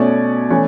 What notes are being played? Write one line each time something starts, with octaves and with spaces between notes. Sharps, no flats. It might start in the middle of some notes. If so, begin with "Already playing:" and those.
Already playing: B2 A3 C#4 D5
E3 A3 C#4